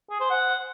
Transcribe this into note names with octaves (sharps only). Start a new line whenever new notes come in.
G#4
C5
F#5